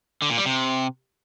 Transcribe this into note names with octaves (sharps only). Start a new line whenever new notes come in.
D3
A#2
G3
C3